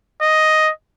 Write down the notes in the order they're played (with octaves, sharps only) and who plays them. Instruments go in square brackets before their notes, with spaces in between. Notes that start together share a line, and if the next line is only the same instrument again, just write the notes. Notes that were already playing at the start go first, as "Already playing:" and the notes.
[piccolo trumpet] D#5